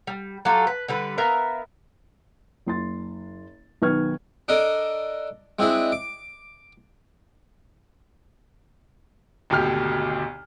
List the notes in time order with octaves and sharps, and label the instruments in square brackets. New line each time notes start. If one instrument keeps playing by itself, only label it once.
[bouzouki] G3
F#3 F4 G4 A4
B4
D3 G3 B4
B3 A#4 E5 F5
[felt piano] F#1 C6 A6
B1 D#3 B4 C#6 F6 G#6
[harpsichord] D4 A4 A#4 D#5
G#3 C4 D4 E4 G#4
D6
[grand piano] G#1 D2 B2 G4 F6